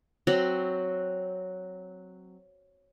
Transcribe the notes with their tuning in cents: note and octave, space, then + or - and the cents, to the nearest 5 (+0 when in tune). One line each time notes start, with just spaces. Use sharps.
F#3 +0 C4 +0 F#4 +0